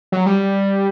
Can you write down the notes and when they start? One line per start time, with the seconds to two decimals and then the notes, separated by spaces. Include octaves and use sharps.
0.12 F#3
0.26 G3